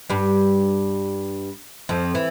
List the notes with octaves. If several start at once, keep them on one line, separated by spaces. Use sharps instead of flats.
G2 G3
F2 F3
E3